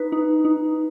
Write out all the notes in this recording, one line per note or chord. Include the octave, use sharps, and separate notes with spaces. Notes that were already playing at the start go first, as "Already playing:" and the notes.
Already playing: D#4 B4
D#4
D#4